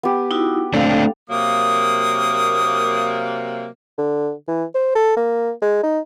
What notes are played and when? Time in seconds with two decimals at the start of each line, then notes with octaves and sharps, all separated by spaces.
0.03 B3 G4
0.31 D#4 E4 F#4
0.74 A3 C4 D4 A4 F5
1.30 C3 F#3 A#3 D#6
3.98 D3
4.48 E3
4.75 C5
4.95 A4
5.16 A#3
5.62 G#3
5.84 D#4